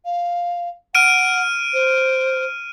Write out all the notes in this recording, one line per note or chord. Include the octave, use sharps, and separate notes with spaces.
F5
F#5 F6 D7 D#7
C5